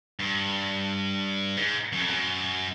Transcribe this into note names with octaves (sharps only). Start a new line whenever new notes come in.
G2
G#2
F#2
F2
F#2